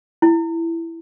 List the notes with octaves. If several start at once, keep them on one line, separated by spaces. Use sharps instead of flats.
E4